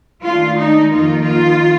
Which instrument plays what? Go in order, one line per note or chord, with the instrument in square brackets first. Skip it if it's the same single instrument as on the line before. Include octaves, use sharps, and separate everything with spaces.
[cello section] D#3 A3 D4 F4
D#4
F2 D#3 A#3 D#4 F4
F4